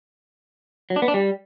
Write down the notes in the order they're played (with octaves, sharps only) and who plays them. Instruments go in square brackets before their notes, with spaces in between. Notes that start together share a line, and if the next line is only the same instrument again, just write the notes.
[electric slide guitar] F#3
D4
B3
D4
G3